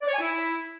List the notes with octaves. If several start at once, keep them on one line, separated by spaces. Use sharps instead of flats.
D5
C#5
G#5
E4